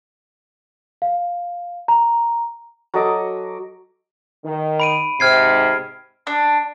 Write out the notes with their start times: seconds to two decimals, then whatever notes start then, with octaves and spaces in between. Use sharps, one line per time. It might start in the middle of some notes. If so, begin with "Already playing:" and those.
1.02 F5
1.88 A#5
2.94 F#3 A4 D#5 D6
4.45 D#3
4.80 B5 D7 D#7
5.20 G#2 C3 F6 G#6 C7
6.27 D4